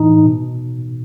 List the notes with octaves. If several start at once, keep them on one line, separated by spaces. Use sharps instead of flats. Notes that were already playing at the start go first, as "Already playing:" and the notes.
Already playing: A2 E3 D#4
B2